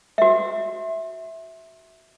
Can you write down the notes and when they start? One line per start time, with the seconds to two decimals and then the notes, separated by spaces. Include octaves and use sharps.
0.18 F#4 E5